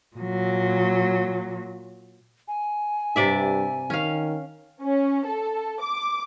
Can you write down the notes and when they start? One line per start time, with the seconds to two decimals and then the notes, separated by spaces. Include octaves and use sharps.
0.17 A#2 F#3
2.48 G#5
3.16 G2 C3 D5 E5
3.90 D#3 C#4 F5
4.82 C#4
5.26 A4
5.81 D6